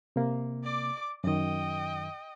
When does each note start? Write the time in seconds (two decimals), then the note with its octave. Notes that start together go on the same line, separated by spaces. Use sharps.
0.16 C3 A#3
0.63 D5 D6
1.24 F#2 D#3 D#5 G5